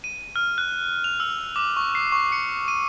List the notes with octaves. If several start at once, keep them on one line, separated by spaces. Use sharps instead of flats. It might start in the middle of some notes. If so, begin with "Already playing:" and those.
D#7
F6
F#6
F7
E6
D6
C#6
C7
C#6
C#7
D#7